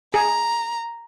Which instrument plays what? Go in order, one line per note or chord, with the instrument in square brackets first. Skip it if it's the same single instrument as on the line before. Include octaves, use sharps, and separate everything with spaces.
[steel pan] G#4 [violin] A#5